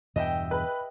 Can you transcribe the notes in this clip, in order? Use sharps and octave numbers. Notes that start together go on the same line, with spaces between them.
E2 G2 B2 D#5 E5 G5
B4